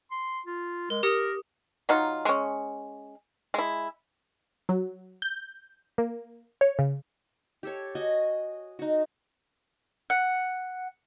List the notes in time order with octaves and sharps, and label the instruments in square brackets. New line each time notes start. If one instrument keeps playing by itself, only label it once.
[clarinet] C6
F4
[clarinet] G#3 [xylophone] A#4
[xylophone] G4 D#6 C#7 [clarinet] A#4
[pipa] F#3 D#4 F4
G#3 C#4
G#3 E4
[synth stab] F#3
G6
A#3
C#5
C#3
[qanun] G4 A4 C#5
F#4 D#5 G#5
D#4 F#4
[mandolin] F#5